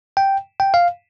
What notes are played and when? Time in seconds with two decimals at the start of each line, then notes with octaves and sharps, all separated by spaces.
0.17 G5
0.60 G5
0.74 F5